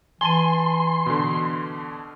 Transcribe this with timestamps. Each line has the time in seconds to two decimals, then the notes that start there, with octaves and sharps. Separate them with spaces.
0.21 E3 G#5 A5 C6 D#7
1.06 B2 D3